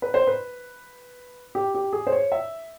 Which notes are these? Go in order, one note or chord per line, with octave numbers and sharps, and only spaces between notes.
B4
C5
B4
G4
G4
G#4
C5
C#5
E5